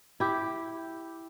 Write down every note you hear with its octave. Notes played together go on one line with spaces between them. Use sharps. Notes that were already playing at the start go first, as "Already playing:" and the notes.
E4 G4